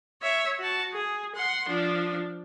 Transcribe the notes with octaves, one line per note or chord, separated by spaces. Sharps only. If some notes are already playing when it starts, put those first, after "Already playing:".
C#5 E5
F#4 A5
G#4
F#5 C6
F3 D4